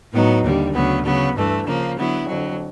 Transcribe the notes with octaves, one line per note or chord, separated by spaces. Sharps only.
A2 F#3 B3 D#4
D#2 D3 G3
D2 C#3 F#3 B3
C#3 F#3 B3
G2 E3 A3
C#3 F3 A#3
D3 F#3 B3 E4
F2 D3 F#3